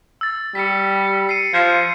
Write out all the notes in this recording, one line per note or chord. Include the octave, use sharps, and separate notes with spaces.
E6 A6
G3 B6 C#7
C7 C#7 D#7
F3 G#6